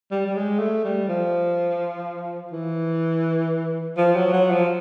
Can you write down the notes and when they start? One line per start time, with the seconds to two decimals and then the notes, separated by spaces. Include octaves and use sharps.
0.11 G3
0.26 G3
0.36 G#3
0.59 A3
0.84 G3
1.08 F3
2.52 E3
3.97 F3
4.16 F#3
4.33 F#3
4.51 F3